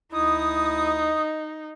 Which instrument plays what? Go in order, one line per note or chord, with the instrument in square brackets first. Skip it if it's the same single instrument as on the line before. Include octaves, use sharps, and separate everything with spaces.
[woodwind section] D2 E4 D#6 [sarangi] D#4